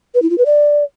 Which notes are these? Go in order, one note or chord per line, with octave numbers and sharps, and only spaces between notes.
B4
E4
F4
B4
D5